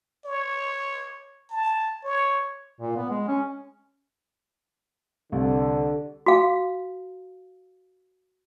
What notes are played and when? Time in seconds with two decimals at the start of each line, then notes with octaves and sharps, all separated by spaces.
0.25 C#5
1.50 A5
2.04 C#5
2.80 A#2
2.97 B3
3.10 G#3
3.28 C#4
5.32 C2 D3
6.26 F#4 F5